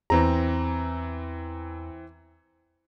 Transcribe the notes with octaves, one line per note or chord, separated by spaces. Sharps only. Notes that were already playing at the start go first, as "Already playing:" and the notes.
E2 E3 C4 A#5